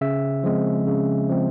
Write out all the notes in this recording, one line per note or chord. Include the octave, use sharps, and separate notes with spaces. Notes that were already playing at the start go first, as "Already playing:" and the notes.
C#3 E5
F3 G#3 C4
C#3
F3 G#3 C4